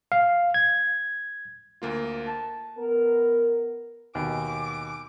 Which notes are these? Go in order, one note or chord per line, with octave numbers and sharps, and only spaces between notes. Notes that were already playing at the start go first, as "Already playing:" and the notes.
F5
G#6
D2 A#3 F4
A5
B3 A#4
D#2 B2 G#5 D6